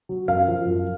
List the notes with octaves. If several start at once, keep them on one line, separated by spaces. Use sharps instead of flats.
F#3
F#2 F5
F3
F#2